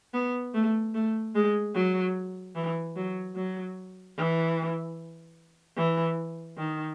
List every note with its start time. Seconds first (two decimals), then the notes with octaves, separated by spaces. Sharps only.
0.14 B3
0.54 A3
0.94 A3
1.35 G#3
1.75 F#3
2.56 E3
2.96 F#3
3.36 F#3
4.17 E3
5.77 E3
6.57 D#3